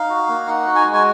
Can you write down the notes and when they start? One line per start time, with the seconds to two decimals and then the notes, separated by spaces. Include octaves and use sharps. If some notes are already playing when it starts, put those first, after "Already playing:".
Already playing: D#4 F5
0.10 F#4
0.28 A#3
0.47 D#4 F#5
0.66 F#4
0.75 G#5
0.85 G#3
0.94 G#5